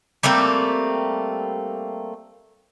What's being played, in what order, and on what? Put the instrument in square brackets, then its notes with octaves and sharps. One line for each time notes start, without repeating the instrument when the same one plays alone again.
[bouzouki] G3 A3 A#3 C4